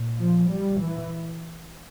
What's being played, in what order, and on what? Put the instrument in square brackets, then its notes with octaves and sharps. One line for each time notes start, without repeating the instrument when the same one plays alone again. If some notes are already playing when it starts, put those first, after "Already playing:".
Already playing: [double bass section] A#2
F3
G3
E3